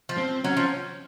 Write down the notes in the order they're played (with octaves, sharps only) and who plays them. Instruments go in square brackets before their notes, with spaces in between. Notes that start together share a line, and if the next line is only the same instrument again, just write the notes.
[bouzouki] F3
[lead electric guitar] C4
[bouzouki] F#3 [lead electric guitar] C#4
[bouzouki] F3